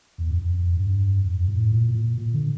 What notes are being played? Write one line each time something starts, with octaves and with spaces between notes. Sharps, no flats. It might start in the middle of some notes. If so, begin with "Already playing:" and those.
E2
F2
F2
G2
F2
A2
A#2
A#2
A#2
D3